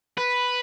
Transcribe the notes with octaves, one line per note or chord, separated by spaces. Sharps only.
B4